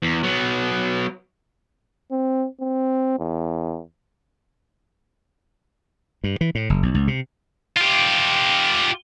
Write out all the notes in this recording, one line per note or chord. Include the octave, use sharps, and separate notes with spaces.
E2
F#3 B3
C4
C4
E2
G2
E3
A2
F#1
B1
C#2
C3
F4 G4